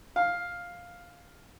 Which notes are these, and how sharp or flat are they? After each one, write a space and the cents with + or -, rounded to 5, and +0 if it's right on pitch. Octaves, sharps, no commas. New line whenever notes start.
F5 +5